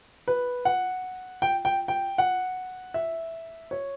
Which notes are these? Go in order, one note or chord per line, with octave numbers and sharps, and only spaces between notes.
B4
F#5
G5
G5
G5
F#5
E5
C#5